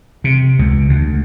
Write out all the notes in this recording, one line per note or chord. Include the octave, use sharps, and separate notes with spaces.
C3
C#2
D2